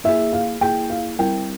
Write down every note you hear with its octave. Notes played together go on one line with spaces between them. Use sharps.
A#3 E4 G#4 E5
F5
A#3 E4 G#4 G5
F5
G3 C4 E4 A#4 G5